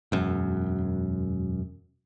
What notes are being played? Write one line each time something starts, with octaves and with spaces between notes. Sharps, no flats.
E1 F#2